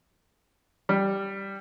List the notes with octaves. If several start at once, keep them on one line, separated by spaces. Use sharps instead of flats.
G3